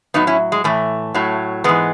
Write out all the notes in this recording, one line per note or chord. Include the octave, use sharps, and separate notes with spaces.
A2 F#3 B3 D#4
C#4 E4
G#3
A2 E3 A3
A2 F#3
G#2 E3 G#3 B3